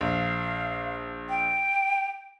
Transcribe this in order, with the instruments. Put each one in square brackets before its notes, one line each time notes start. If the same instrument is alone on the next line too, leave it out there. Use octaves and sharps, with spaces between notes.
[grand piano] A#1 [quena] F5
[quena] G5